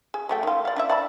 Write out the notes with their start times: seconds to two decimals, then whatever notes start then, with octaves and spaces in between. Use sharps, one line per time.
0.14 G#4
0.29 F#3 A3 G5
0.43 D#3 F4
0.65 D5 F5
0.76 D4 E4 E5
0.90 D5 A5 B5